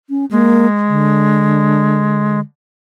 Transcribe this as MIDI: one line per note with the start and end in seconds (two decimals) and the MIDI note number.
0.10 0.25 61
0.31 2.40 56
0.31 0.67 58
0.88 2.41 50